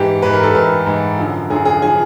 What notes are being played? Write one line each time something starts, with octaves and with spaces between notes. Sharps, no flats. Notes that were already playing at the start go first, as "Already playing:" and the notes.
Already playing: G#2 E3 G4
G#2 E3 B4
A#4
A4
G#2 E3 A#4
G#2 E3
F#2 D3 F3
F#2 D3 F3 G#4
G#4
D3 F3 G#4